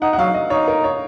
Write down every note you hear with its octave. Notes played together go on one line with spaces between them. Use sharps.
D#4 F#5
F#5
F#3 F5
D#5
D#4 C#5
A#4
C#5